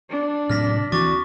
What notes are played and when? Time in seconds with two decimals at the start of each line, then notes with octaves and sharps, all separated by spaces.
0.10 D4
0.50 A2 C3 F#3 F6 A#6 B6
0.92 D2 E3 C4 F#4 C#6 D6 A6